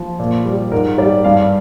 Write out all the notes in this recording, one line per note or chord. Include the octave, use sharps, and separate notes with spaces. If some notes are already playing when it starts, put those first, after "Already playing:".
Already playing: F3
A#2
G3
G#2 A#4
G3 D5
G2 F5